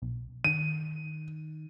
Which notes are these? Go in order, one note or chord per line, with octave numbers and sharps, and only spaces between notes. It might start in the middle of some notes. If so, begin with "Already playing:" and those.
B1
D#3 D#7